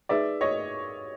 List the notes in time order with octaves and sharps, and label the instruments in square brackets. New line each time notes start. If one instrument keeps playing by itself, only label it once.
[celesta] D#4 G#4 B4 [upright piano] D5 E5
[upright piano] C#5 D#5